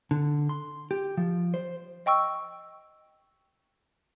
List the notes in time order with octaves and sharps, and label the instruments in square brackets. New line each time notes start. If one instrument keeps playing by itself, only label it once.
[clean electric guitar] D3
C6
G4
F3
C5
[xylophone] D#5 G5 C#6 E6